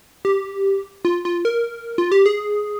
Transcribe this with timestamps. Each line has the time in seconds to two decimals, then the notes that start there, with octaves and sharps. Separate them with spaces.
0.25 G4
1.05 F4
1.25 F4
1.45 A#4
1.98 F4
2.12 G4
2.26 G#4